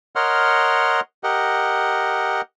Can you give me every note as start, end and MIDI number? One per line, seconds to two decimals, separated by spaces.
0.16 1.00 70
0.16 1.00 73
0.16 1.00 75
0.16 1.00 78
0.16 1.00 84
0.16 1.00 89
1.24 2.41 67
1.24 2.41 70
1.24 2.41 75
1.24 2.41 78